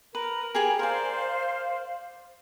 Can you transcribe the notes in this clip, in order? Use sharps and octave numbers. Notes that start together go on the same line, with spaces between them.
A#4 B4
G4 G#4 G#5
A#4 C5 D5 F5